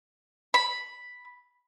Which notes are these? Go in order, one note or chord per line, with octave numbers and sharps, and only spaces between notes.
B5